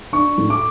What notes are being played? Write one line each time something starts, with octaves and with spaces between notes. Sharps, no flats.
D4 C#6
A2
D6